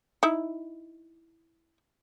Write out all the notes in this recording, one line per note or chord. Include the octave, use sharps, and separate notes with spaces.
D#4 E4